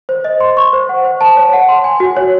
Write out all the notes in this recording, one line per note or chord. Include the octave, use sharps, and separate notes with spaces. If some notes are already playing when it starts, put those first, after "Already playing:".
C5
D#5
C6
C#6
C5
F#5
C5
A5
C#5
F#5
C6
G#5
F#4
C#5